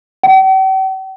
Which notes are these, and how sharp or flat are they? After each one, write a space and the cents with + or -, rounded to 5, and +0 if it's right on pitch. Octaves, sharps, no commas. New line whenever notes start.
G5 -45